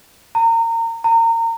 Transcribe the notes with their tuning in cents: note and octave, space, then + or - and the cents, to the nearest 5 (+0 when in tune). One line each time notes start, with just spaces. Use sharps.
A#5 -30
A#5 -30